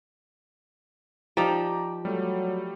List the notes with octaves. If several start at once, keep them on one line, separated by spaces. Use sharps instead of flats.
F3 D#4 G4 D5 A#5
F#3 G3 A3